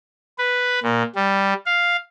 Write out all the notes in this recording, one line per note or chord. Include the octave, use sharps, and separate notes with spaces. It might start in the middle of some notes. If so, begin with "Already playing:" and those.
B4
A#2
G3
F5